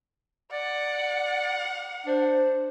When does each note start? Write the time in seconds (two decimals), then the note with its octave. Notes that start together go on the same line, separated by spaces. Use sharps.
0.53 D5 F#5
2.06 D4 C5